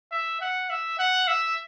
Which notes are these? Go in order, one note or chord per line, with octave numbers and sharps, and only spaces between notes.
E5
F#5
E5
F#5
E5